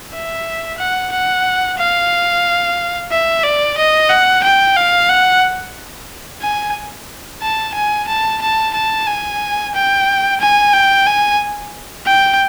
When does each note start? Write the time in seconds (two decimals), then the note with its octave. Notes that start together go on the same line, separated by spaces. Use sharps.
0.13 E5
0.79 F#5
1.12 F#5
1.78 F5
3.11 E5
3.44 D5
3.78 D#5
4.10 F#5
4.44 G5
4.77 F5
5.10 F#5
6.42 G#5
7.42 A5
7.75 G#5
8.08 A5
8.42 A5
8.74 A5
9.07 G#5
9.74 G5
10.40 G#5
10.74 G5
11.07 G#5
12.06 G5